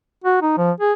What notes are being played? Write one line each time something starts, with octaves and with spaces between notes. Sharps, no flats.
F#4
D#4
F3
G#4